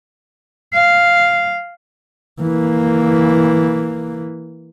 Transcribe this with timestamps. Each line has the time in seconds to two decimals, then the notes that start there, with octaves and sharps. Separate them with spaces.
0.74 F5
2.41 E3 A#3